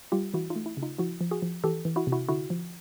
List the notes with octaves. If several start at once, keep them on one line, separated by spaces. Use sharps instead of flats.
G3 F4 G4
E3 E4 F#4
D#4 F4
A3
E4
C#3
D#4 F4
F3 E4 F#4
F3
F#4 G#4
F3
E3 G4 A4
E3
E4 F#4
C3
E4 F#4
D3 E4 F#4
F3